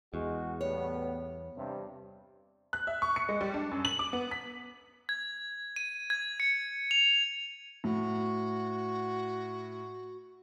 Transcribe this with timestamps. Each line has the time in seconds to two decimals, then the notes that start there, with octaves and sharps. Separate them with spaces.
0.14 E2 G#3 F#4
0.61 A2 G3 B3 C#5
1.56 G2 C3
2.73 F#6
2.87 E5
3.02 C#6
3.16 C#7
3.29 G#3
3.41 G3
3.54 D4
3.71 F#2
3.85 F#7
3.99 D6
4.13 B3
4.31 B6
5.09 G#6
5.76 D#7
6.10 G#6
6.40 C#7
6.91 F7
7.84 A2 F#4